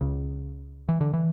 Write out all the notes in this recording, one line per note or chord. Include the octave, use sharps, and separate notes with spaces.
C#2 C#3
E3
D3
E3